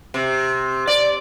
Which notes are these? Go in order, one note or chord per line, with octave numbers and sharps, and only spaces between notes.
C3
D5